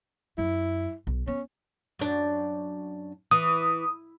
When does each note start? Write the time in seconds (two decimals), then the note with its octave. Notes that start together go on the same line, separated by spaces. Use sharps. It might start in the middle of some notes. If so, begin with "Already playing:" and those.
0.38 F#2 E4
1.07 B1
1.27 B3 C#4
1.99 F#2 D4
3.31 E3 D#6